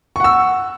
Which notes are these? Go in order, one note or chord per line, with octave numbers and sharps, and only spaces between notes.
F#5 C#6 E6